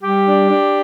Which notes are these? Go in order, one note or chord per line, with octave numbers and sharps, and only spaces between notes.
G3 G4
D4
D4